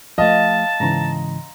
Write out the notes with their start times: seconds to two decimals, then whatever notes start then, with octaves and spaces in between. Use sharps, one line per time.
0.18 F3 A3 D#5 F5 A5
0.80 G#2 C#3 E3 A#5 C6